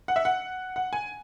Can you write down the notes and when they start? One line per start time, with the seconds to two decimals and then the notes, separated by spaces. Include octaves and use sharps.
0.08 F#5
0.16 E5
0.25 F#5
0.76 F#5
0.93 G#5